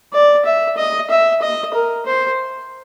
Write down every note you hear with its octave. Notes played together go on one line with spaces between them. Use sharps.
D5
E5
D#5
E5
D#5
A#4
C5